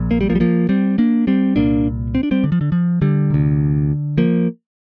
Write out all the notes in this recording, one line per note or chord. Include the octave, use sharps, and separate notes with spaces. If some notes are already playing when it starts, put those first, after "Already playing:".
Already playing: A#1 A#2
A#3
G3
F3 A#3
G3
F3 A#3
G3 C4
A#3 D4
G3 C4
C2 A#2 A#3 D4
C4
D4
G3 C4
D3
F3
D3
F3
D3 G3
D2 C3
F3 A#3